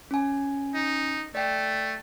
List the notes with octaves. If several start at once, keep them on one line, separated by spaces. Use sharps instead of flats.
C#4 G#5
D#4
A3 D5 G5 C7